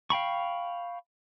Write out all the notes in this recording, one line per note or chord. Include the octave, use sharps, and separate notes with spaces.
F5 G5 B5 C#6